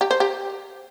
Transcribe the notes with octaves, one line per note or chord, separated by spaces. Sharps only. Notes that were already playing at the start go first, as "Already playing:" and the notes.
G4
C5
G4